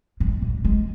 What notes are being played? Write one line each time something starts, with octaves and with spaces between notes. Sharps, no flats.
G#2
A#2
G#3